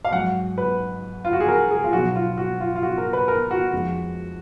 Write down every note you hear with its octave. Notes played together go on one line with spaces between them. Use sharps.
F5
G#2 F#3 F#5
B4
F4
F#4
G#4
A#4
G#4
F4
B2 F#3 F#4
F4
F#4
F4
F4
F#4
A#4
B4
A#4
F#4
F2 F3 G#3